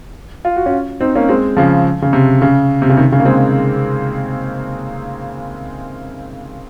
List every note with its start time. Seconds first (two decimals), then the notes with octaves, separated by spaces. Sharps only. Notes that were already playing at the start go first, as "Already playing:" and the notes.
0.45 F4
0.56 F#4
0.66 C#4 F4
1.01 C4 D#4
1.15 A#3 C#4
1.29 G#3 C4
1.57 C#3 F3
2.02 C#3
2.13 C3
2.42 C#3
2.82 C3
2.89 C#3
2.97 C3 D#3
3.12 C#3
3.20 A#3
3.25 G#3 C4